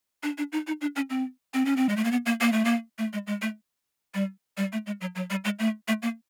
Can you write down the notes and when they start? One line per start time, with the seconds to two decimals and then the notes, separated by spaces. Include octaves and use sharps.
0.23 D4
0.38 D4
0.52 D#4
0.67 D#4
0.81 D4
0.96 C#4
1.10 C4
1.54 C4
1.65 C#4
1.76 C4
1.89 G#3
1.96 A3
2.04 A#3
2.12 B3
2.26 A#3
2.41 A#3
2.52 A3
2.65 A#3
2.98 A3
3.13 G#3
3.27 G#3
3.42 A3
4.14 G3
4.57 G3
4.73 A3
4.86 G#3
5.01 F#3
5.15 F#3
5.30 G3
5.45 G#3
5.59 A3
5.88 A3
6.02 A#3